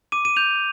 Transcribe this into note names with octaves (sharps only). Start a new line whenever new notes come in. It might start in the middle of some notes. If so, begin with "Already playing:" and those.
D6 D#7
D#7
G6 F7